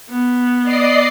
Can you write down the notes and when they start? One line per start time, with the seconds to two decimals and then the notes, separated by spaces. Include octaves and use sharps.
0.10 B3
0.63 D5 D#5 C7